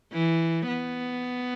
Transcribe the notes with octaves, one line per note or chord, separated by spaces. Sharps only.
E3
B3